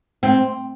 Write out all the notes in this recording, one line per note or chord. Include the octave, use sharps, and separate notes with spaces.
C4